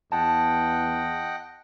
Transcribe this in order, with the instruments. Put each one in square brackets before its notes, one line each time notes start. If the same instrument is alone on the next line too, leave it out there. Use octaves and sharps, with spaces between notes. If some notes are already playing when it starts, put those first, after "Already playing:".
[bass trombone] E2 [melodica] D#5 F#5 G5 [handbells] A5